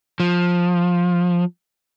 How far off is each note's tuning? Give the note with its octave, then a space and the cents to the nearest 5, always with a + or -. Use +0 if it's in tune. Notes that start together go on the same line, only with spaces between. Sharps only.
F3 +15